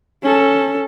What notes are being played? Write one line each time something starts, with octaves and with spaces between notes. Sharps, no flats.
C#4 A4